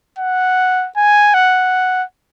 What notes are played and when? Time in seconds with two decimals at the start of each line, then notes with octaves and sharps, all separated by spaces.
0.19 F#5
0.96 G#5
1.34 F#5